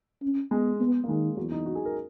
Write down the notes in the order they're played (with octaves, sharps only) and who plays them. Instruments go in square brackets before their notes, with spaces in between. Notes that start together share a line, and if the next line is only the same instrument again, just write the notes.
[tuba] C#4
[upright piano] G#3 [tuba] B3
[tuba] B3
[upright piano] A#3
[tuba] D#3 [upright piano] G#3
[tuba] E2 [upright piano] F#3
[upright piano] D#4
F#4
G#4
A#4